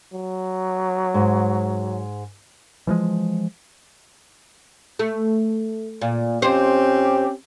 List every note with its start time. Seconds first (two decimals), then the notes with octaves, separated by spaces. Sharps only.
0.13 F#3
1.14 G#2
2.87 E3 F3 G#3
4.99 A3
6.01 A#2
6.42 F2 C4 C#4 G4 C5